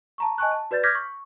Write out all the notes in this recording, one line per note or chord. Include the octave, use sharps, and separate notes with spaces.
A5 A#5 C#6
D#5 G#5 A5 C#6 F#6
A5
F#4 B4 D5 G6 A6
D6 F6 G6 G#6 A#6 B6
C#6